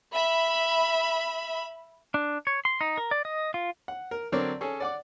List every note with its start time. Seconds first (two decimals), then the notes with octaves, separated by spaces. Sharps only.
0.13 E5 B5
2.14 D4
2.47 C#5
2.65 C6
2.81 D#4
2.98 A#4
3.11 D5
3.25 D#5
3.54 F4
3.88 F#5
4.11 A#4
4.32 D3 F#3 C4 A#4 C#5 D5
4.61 C#4 G#4 A4
4.80 D5 F#5 D6